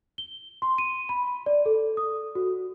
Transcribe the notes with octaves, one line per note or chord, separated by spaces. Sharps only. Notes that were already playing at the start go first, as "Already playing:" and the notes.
G7
C6
D#7
B5
D5
A4
D#6
F#4